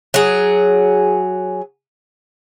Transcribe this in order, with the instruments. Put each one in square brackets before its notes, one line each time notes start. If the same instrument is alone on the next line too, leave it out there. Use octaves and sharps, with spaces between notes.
[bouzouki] F#3 G#4